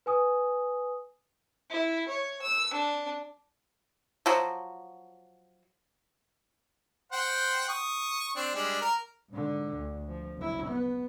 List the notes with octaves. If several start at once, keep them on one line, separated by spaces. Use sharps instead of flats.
B4 G#5 D#6
E4
C#5
E6
D4
F3 F#3
C5 F#5 G5
C#6 D#6
C4 D4
G3 G#3 D4
A#4
G#2 D3
D2
F3
F#1 E4
B3